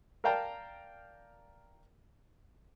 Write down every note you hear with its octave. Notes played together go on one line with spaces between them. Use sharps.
A#4 D5 F5 G5 A5 A#5